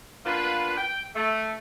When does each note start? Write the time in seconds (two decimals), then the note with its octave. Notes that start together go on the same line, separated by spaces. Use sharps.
0.25 A#3 B3 D4 F4 B4
0.77 G5
1.15 A3